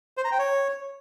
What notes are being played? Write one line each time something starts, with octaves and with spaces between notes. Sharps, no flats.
C5
A#5
G5
C#5